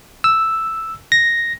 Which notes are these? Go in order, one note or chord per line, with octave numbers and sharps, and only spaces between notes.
E6
A#6